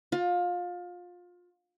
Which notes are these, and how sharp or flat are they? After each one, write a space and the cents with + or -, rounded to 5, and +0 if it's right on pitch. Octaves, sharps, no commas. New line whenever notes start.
F4 +25